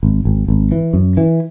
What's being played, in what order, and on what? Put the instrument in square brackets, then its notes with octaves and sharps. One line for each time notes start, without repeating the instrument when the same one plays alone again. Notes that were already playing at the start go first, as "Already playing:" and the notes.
[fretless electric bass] G#1
G#1
G#1
E3
F#2
E3